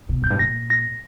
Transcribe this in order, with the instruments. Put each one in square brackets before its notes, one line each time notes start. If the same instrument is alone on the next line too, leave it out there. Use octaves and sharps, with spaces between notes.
[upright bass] B2
[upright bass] F#2 [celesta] G6
[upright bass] G2
[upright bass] A#2 [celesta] A#6
[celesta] A#6